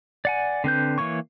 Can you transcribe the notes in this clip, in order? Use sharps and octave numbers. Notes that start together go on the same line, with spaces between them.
D5 F#5 G#5
D3 C4 B4 G6
E3 A#3 C#5 C#6